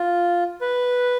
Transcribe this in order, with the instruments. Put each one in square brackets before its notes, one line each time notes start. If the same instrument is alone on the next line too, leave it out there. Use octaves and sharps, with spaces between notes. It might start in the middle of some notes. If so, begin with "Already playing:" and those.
Already playing: [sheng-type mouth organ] F4
B4